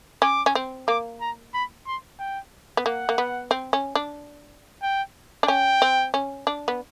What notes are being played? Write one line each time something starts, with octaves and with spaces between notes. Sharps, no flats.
C#4 D6
C#4
C4
A#3 D6
A#5
B5
C6
G5
B3
A#3 F#5
A#3
B3
C4
C#4
D4
G5
D4
C#4 G5
C4
C#4
D4
B3